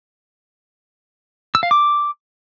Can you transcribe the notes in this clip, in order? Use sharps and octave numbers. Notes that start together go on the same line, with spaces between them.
E6
F5
D6